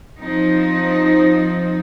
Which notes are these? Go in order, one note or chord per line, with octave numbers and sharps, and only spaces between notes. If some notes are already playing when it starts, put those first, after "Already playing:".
F3 C4 D#4